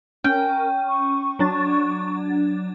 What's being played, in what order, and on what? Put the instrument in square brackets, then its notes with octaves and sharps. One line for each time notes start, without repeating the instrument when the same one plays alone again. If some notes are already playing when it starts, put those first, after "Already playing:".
[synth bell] C#4 [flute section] A#4 [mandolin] G5
[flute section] C#6
[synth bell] F#3 D4 A6